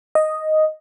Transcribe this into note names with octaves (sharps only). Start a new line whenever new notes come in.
D#5